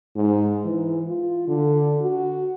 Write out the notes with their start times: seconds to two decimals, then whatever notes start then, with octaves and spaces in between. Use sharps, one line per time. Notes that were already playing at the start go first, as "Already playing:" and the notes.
0.16 G#2
0.65 E3
1.08 F4
1.48 D3
2.01 F#4